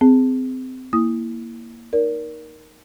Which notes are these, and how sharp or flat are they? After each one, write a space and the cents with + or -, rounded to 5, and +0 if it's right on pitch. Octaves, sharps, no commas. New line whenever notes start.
C4 -25 G#4 +0
A#3 +0 E4 +0 D#6 +0
D#4 +0 A#4 +10 D5 -25